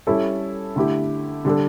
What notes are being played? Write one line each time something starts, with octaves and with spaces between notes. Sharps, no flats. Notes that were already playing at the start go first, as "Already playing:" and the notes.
G3 C#4 E4 A4
D3 A3 E4 G4
D3 G3 D4 A4